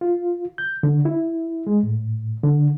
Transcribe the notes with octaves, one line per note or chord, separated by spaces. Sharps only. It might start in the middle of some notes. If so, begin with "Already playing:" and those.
F4
G6
D3
E4
G#3
A2
D3